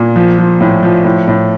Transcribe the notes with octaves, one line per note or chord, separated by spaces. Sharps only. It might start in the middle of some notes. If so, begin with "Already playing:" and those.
Already playing: A#2
F3
F3
A2
F3
A2
A2